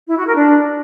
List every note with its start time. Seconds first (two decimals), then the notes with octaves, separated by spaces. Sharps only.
0.08 E4
0.17 F#4
0.26 A#4
0.35 D4